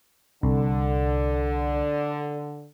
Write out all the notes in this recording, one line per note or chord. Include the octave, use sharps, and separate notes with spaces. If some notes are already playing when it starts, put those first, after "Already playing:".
C2 D3